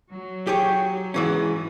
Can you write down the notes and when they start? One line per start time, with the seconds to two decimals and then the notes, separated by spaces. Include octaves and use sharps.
0.12 F#3
0.47 G4 G#4 C#5
1.14 G#2 E3 C#4